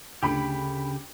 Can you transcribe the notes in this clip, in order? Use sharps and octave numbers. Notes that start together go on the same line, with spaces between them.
D2 C#3 G4 B5